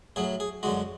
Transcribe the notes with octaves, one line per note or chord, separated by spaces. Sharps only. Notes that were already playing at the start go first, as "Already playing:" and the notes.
A2 F#3 G#4
G#4
F#2 D3 G#3 F#4